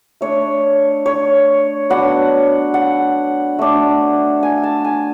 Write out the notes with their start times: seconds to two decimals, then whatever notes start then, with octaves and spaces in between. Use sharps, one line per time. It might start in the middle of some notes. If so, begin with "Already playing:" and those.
0.21 A3 D4 C#5
1.06 C#5
1.90 F#3 B3 D4 F#5
2.74 F#5
3.59 A3 D4
4.43 G#5
4.63 A5
4.85 G#5